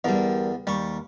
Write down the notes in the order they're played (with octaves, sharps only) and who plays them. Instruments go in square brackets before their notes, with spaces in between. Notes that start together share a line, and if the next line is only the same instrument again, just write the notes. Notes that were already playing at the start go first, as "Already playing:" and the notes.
[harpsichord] E2 D3 [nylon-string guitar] G3 A#4
[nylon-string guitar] D#2 [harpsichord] G3 C#6